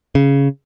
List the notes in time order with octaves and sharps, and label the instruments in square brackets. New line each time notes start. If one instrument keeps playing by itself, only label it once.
[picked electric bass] C#3